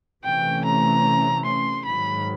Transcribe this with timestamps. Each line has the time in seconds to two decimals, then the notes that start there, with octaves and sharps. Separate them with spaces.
0.24 C3 E3 A3 C#4 G5
0.65 A#5
1.45 C6
1.86 G#2 D#3 F#3 B5